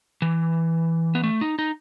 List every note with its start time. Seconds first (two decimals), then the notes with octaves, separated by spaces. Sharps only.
0.22 E3
1.15 B3
1.24 A3
1.41 D#4
1.59 D#4